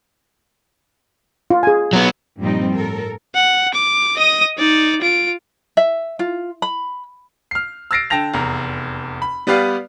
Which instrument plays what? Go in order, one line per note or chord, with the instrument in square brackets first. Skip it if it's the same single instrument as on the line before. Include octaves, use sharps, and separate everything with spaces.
[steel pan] F4
G#4 G#5
[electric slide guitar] F#3 B3
[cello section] G2 A#2 F3 G3 C4 D#4
A2 A4 A#4
[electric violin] F#5
D6
D#5 D#6
D#4 D5
F4 D7
[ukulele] E5
F4
B5
[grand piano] F6 C7
E6 F6 A6 A#6 C7 D7
D3 G5 A5 A#6 F7
F1 E2 A#5
B5
G3 B3 G4 B4 D5 F5